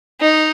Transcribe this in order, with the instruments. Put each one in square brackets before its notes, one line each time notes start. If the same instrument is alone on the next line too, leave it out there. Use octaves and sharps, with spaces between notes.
[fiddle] D#4